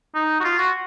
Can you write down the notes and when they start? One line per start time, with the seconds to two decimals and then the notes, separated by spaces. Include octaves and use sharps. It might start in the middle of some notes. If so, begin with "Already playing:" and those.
0.15 D#4
0.40 F#4
0.44 F4
0.58 F#4